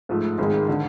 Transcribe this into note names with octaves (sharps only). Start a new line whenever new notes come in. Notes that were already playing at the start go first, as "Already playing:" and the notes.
G#2 F3 A3
G#1 G#2 D#3 G#3
D3